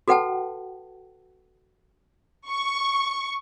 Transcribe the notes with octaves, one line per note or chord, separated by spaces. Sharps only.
F#4 A4 B4 F#5 G5 A5
C#6